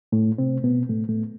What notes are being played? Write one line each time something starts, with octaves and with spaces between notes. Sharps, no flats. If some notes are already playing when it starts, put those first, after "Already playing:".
A2 A3
C3 C4
B2 B3
A2 A3
A2 A3